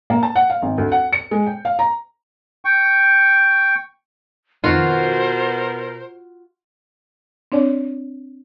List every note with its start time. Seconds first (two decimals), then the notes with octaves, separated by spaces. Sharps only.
0.10 A#3
0.23 A5
0.36 F#5
0.50 F5
0.62 G#1
0.78 D2
0.92 F#5
1.13 C#7
1.31 G#3
1.47 G5
1.65 F5
1.79 A#5
2.65 G5 C#6
4.64 F2 B2 D#3 F4 F#4 A#4 C5
7.52 C4 D4 C#5 D5